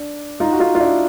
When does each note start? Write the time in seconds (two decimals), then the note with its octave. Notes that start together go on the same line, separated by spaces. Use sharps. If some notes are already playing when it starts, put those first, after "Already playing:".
Already playing: D4
0.40 D#4 F4
0.52 F#4
0.60 D#4 F4
0.75 F4
0.80 D4 E4